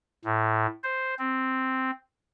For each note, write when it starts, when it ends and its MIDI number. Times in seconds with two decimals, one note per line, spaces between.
0.25 0.67 45
0.83 1.14 72
1.19 1.91 60